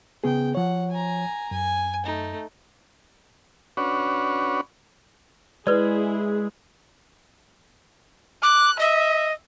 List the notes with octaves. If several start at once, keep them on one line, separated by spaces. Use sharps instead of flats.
C#3 B3 G#4 G5
F3 C#5 F#5
G#5 A#5
F#2 G#5
A3 D#4
C#4 D4 F#4 B4 C#5
G#3 E4 G#4 B4 D5
D6 F#6
D#5 E5